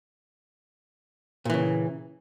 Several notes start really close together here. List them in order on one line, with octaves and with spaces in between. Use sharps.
A#2 E3 C#3